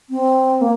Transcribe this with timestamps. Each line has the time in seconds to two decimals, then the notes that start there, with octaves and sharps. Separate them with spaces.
0.10 C4
0.61 A#3